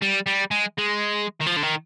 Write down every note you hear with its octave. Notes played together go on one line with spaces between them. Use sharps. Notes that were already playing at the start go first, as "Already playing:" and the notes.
G3
G3
G#3
G#3
D#3
F3
D3
D#3